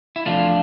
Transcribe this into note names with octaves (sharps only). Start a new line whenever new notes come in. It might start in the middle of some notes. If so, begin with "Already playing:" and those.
E4
E2 C3 F3 A3 D4 F4